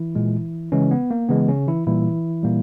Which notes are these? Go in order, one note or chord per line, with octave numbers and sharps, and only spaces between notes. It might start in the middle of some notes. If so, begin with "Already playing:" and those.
Already playing: E3 E4
A#2 G#3
C#3 E3 G#3 C#4
B3
A#3
C#3 E3 G#3 B3
C#3 C#4
E3 E4
A#2 E3 G3 A#3 E4
A#2 G3 A#3